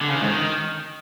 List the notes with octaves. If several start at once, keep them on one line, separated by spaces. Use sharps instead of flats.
D3
C#3
D#3
G#2
D#3